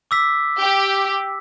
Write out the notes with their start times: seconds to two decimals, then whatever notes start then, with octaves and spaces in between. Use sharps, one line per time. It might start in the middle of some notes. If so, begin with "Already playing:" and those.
0.11 D6 E6 B6
0.62 G4